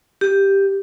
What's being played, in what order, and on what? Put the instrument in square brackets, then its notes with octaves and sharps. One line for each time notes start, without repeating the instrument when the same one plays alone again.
[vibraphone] G4